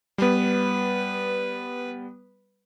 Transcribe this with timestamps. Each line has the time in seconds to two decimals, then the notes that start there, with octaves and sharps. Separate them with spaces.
0.18 G3 B3 B4